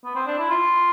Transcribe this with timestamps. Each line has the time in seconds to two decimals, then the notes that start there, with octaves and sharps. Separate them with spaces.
0.05 B3
0.16 C4
0.27 D4
0.39 E4
0.50 F4